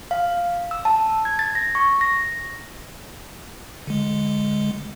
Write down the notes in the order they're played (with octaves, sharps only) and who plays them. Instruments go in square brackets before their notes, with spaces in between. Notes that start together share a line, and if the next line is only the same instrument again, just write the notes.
[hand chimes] F5
E6
A5
G#6
A6
A#6
C#6
A#6
[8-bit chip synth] D3 G#3